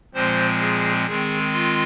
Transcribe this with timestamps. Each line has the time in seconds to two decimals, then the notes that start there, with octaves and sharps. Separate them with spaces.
0.14 A#2 F3 G#3 C4 C5
0.60 G#4
1.06 D#3 G#3 C4 G#4
1.53 F4